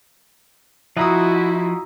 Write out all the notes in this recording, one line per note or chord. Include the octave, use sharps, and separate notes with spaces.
F3 E4 F#4 D#5 E5 F#5 A#5 D#6